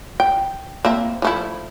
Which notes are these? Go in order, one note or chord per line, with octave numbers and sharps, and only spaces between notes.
G5
A#3 C4 E5
F3 A3 E4